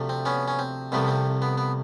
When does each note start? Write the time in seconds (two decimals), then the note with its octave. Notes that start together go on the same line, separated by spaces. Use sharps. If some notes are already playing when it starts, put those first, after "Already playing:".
Already playing: D2 C3 F3 A3
0.09 C4
0.25 B3 C#4
0.48 C#4
0.59 C4
0.92 C2 C3 F3 A3 B3
1.08 C4
1.42 B3
1.58 B3